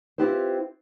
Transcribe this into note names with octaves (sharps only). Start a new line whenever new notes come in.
C4 E4 F4 G4 B4 C5